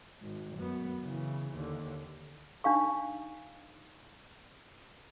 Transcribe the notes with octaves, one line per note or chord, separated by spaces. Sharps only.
G#1
F#2 B3
C#3 E3
D#2 D3
D4 D#4 F5 C#6